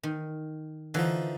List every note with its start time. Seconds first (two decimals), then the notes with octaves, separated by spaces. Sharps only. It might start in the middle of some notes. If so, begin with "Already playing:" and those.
0.03 D#3
0.94 D3 E3 F3 D#4